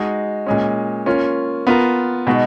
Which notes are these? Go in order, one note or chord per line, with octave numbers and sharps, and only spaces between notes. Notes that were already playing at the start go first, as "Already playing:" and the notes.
Already playing: G#3 D#4 F#4
A#2 G#3 C#4
A#3 C#4 F4
B3 F4 A#4
B2 G#3 D#4 F#4